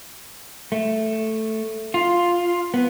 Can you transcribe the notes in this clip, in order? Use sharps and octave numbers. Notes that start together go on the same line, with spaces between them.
A3
F4
B3